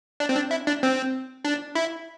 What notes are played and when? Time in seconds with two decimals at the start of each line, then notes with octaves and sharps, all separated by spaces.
0.20 D4
0.29 C4
0.35 D4
0.51 E4
0.67 D4
0.83 C4
1.45 D4
1.75 E4